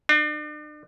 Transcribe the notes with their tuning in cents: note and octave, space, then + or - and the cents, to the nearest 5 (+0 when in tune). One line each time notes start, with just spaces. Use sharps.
D4 +40